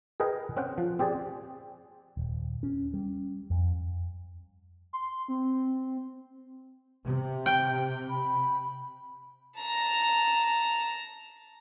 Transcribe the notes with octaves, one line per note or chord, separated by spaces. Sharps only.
G#4 A#4 B4 D#5 G5 G#5
C4 C#4 F#5 G5
F3
C4 G4 G#4 D5 G#5
D#1
C#4
G3
F2
C6
C4
C3
G5
B5
A5 A#5